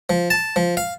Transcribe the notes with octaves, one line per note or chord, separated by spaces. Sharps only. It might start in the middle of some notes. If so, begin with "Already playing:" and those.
F3
A5
F3
F5